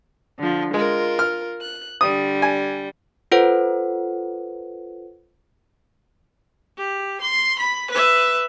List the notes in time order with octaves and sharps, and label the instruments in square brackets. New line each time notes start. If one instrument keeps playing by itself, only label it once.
[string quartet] D3 F3
[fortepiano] G#3 [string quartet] F4 A#4
[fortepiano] F6
[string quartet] F#6
[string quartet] D3 G3 [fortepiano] D#6
[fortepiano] G#5
[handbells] F4 A4 B4 C5 F#5
[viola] G4
C6
B5
B4 E5